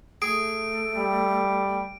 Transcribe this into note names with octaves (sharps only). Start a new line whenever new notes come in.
A3 G#4 D7
G3